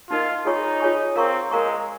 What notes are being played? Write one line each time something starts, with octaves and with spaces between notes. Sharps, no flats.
D#4 F4 A#4 D#5
D#4 F4 G#4 C#5 G#5 C#6
F4 G#4 C#5 G#5 C#6
C4 A#4 F5 A#5 C#6
G#3 A#4 F5 A#5 C#6